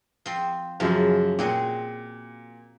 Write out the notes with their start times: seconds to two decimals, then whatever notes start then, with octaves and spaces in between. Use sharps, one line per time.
0.26 F3 C4
0.80 F#2 C#3 F3 A#3
1.39 A#2 C4 F#4 G#4